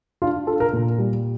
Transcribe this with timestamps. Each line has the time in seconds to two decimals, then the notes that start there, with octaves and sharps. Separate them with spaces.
0.22 D4 F4
0.47 F4 A4
0.60 A#4
0.73 A#2
0.98 G3